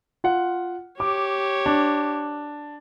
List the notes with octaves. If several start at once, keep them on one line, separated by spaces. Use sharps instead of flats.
F4 F#5
G4 C#5 D6
D4